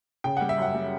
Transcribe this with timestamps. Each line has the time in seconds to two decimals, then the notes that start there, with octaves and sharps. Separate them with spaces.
0.24 C#3 G5
0.37 G3 F#5
0.49 E5
0.58 F#2 F#5
0.74 G3